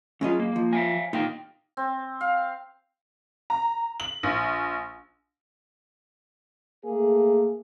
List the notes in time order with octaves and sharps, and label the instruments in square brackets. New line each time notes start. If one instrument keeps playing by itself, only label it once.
[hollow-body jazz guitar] F#2 G#3 D#5 [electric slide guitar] C#4 F4
[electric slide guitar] A#3
[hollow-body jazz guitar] F3
[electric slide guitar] E5 F5 G#5
[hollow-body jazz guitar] A#2 [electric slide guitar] D#4 F5 G5
[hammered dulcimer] C4
F5
[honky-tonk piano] A#5
F#7
A#1
[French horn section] A3 A#3 G#4